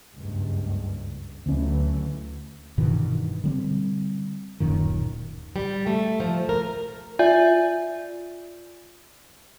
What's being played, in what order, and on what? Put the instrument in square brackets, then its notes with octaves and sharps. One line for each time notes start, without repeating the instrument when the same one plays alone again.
[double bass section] F#1 C#2 G2
[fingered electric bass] D2 C#4 [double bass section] E3 F#3 A3
[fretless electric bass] G2 B2 D#3 E3
D3 G3 C4
D1 F#2 A#2 D#3
[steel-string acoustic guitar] G3
A3
F3
A#4
[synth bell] F4 D5 E5 G#5 G6